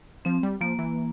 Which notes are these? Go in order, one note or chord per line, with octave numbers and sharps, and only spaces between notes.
F3 C4
G3
F3 A#3
E3